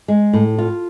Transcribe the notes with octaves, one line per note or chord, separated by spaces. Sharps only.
G#3
A2
F4